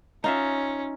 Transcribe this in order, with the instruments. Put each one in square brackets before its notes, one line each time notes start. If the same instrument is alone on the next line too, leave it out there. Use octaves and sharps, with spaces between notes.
[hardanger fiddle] C#4 [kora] D#4 F4 E5